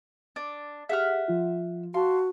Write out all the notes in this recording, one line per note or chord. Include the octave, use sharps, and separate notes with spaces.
D4
G4 G#4 E5 F#5 F6
F3 F4
F#4 F5 A5 C6